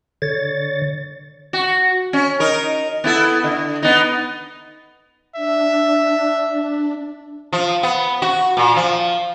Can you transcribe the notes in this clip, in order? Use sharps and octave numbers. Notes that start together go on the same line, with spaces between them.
D3 C#5 A6
F#4
C#4
D#4 A#4
B3 E4 A4
D3
B3 D#4
D4 E5
F3
B3
F#4
A#2
F3